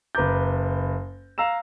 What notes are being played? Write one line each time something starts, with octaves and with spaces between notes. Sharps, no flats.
F#1 B4 A#5 D6 G6
F5 A#5 E6 E7